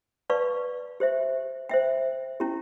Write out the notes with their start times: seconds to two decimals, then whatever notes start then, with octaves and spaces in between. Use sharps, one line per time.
0.30 B4 D5 F5 A5 C#6
1.00 G4 C5 E5
1.69 C5 E5 G5
2.40 C#4 E4 G4